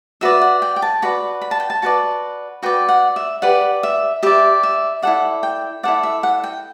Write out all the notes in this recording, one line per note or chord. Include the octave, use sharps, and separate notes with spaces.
F#4 B4 D5 E5
F#5
G5
G5
A5
F#4 B4 D5 B5
B5
A5
G5
A5
F#4 B4 D5 A5
F#4 B4 D5 G5
F#5
E5
G4 B4 D5 F#5
E5
G4 B4 D5 E5
E5
E4 A4 D5 F#5
G5
E4 A4 D5 F#5
E5
F#5
G5